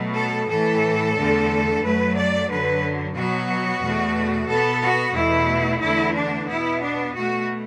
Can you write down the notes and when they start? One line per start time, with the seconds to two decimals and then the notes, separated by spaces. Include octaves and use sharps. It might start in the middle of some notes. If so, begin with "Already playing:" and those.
Already playing: B2 F#3 A3
0.16 A4
0.49 A2 E3 A3 A4
1.16 E2 D3 A3
1.82 F#2 F#3 A3 B4
2.15 D5
2.49 F#2 D3 F#3 B4
3.15 B2 F#3 B3 F#4
3.82 E2 B2 A3
4.49 B2 B3 A4
4.82 F#4
5.15 E2 B2 A3 E4
5.81 E2 D3 A3 E4
6.15 D4
6.48 B2 B3 E4
6.81 D4
7.14 B2 A3 F#4